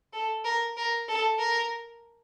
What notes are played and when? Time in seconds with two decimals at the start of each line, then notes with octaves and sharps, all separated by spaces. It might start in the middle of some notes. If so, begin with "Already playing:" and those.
0.13 A4
0.44 A#4
0.77 A#4
1.08 A4
1.39 A#4